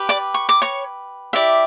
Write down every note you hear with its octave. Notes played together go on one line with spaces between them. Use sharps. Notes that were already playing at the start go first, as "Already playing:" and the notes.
Already playing: G4 B4
D5 D6
C#6
D6
C#5 C#6
E4 G4 D5 E5